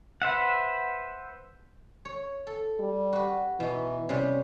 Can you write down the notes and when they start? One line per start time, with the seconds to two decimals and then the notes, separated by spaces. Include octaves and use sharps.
0.22 B4 C5 E5 F#5
2.05 C#5
2.47 A4
2.80 G3
3.13 F#4 B4
3.60 B2 E3 D#4
4.09 C3 G3 C#4 B4